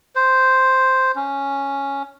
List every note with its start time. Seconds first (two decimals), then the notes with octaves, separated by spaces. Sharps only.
0.16 C5
1.16 C#4